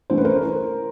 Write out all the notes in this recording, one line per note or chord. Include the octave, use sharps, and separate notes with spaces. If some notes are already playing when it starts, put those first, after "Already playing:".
E3 A3 C#4 C5
B4
A#4 C5